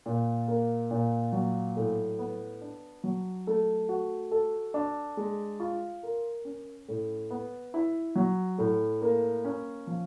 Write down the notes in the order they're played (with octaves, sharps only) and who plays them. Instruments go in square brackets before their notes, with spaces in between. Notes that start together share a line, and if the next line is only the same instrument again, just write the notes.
[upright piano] A#2
A#3
A#2
F#3
A2
B3
D4
F#3
A3
F#4
A4
D4
G#3
F4
A#4
C#4
A2
B3
E4
F#3
A2
A#3
C#4
F3